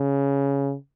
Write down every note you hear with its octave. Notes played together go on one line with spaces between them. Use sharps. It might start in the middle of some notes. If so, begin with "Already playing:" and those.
Already playing: C#3